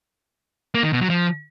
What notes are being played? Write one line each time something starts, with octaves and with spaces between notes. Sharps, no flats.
A#3
D#3
B2
F#3
F3